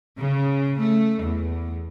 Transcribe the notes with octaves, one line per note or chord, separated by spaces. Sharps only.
C#3
A3
E2